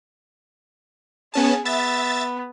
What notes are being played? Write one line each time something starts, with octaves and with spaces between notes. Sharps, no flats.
B3 C#4 G#4 A5
B3 E5 A6